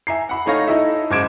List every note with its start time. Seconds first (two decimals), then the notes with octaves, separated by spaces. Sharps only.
0.07 E5 G#5 A#5 C7
0.29 F#5 B5
0.46 A3 D#4 C#5 F5 A#6
0.68 D#4 E4 A4 D#5 E5
1.11 F#1 G#2 D6 G#6 D7 E7